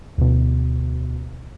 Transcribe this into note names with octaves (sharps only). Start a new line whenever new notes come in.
D2 B2